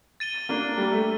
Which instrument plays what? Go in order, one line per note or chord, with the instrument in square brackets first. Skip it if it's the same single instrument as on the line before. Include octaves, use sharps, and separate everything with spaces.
[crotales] A6 D#7 G7
[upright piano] A#3 D4
G3 A#3
A3